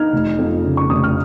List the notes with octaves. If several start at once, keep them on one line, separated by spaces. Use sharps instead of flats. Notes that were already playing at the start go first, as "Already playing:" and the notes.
Already playing: D#4 F6 G#6
F1
F2
C#3
C#6
F1 D#6
F6